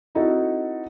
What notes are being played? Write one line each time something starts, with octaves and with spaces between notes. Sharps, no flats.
C4 D#4 E4 F#4 A4